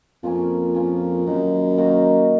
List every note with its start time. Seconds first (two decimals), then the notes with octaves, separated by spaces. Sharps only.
0.23 F2 F3 A#3 C#4
0.74 F3 A#3 C#4
1.26 F#2 D#3 A#3 D#4 F#4
1.78 D#3 A#3 D#4 F#4